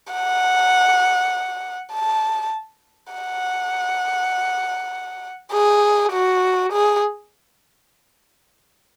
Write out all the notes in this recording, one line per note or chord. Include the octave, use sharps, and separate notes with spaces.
F#5
A5
F#5
G#4
F#4
G#4